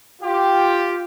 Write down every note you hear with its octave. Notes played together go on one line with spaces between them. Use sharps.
F4 G4